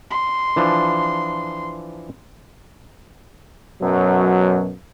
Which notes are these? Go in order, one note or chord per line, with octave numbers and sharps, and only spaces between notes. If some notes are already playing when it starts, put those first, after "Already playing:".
C6
E3 F3 D4
F#2 B2 F#3